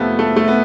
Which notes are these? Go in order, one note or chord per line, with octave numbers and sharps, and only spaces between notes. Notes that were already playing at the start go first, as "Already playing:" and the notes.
Already playing: F2 C3 F3 A3 B3
A3
A3
B3